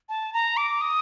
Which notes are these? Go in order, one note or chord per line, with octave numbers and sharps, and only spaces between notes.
A5
A#5
D6
D#6